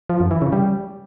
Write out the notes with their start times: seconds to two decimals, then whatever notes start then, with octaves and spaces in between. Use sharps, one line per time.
0.09 F3
0.20 F#2
0.31 E3
0.42 C#3
0.52 G3